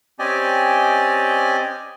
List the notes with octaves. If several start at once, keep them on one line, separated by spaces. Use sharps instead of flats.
C4 C#4 G4 D5 D#5 G#5